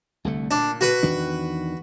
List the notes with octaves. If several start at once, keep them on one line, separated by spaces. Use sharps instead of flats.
C2 D3 A3
A#2 D4
F#4 B4
E2 D#3 D4